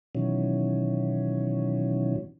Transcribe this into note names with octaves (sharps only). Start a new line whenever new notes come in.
B2 D#3 E3 F#3 C#4